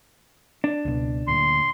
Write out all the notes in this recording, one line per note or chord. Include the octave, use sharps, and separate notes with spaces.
D4
C#2 B2
D2 A#2 C6